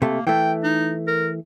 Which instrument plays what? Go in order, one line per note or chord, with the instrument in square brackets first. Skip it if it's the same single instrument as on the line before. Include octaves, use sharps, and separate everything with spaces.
[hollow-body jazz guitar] C3 A3 [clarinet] A#3
[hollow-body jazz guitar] E3 A3 [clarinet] G5
[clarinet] D#4
A#4